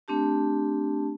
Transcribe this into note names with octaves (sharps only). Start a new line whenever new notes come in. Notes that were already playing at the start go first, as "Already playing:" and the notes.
A3 C4 D4 G4 A5